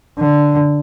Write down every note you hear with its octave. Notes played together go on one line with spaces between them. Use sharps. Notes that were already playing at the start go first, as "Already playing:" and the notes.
D3